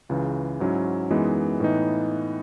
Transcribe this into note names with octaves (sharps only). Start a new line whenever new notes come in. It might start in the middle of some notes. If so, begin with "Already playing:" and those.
C#2 C#3 E3
G#2 F#3 C#4 E4
F#2 E3 G#3 B3 D#4
A2 E3 B3 D#4